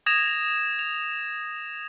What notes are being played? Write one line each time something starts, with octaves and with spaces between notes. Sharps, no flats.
D#6 G#6 A#6 E7 F7
F7